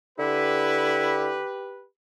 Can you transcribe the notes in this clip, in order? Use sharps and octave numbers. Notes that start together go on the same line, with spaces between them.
D3 E4 G4 B4